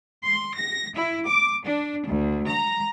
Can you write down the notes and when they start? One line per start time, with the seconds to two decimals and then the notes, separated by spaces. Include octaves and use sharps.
0.24 C6
0.56 A#6
0.97 E4
1.28 D6
1.66 D4
2.09 D2
2.49 A#5